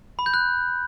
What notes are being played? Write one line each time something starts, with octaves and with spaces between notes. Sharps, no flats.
B5
G6
F#6